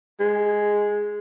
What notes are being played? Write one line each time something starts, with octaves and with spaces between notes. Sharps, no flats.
G#3